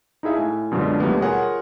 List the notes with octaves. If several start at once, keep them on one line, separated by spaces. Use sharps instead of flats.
D#4 E4 G#4 E5 F5
A2 G#5 A5
F#2 B2 D3 G#3 D4 F4
D#2 B2 F#3 G3 A3 B3
F4 G#4 A#4 C#5 F#5 G#5